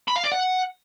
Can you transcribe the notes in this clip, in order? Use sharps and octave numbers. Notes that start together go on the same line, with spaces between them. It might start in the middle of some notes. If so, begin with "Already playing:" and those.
B5
F5
D5
F#5